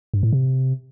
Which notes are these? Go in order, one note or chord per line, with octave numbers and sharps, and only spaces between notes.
G2
A2
C3